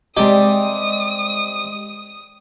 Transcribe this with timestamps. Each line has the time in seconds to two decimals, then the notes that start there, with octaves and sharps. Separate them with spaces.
0.17 C3 G3 G#3 C4 G4 D#5 D#6